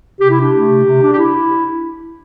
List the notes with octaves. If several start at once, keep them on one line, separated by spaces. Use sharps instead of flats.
C3 G4
D4 E4
G4
A3
C3
C3
D4
G4
E4